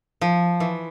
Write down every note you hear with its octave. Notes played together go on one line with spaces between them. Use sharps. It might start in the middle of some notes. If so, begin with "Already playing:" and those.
F3
E3